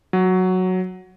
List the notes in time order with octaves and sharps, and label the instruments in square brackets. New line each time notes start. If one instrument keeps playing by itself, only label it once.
[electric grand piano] F#3